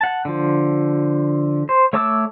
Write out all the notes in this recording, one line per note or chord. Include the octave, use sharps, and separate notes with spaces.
F#5 A5
D3 F3
C5
A3 C#5 A5 D6 E6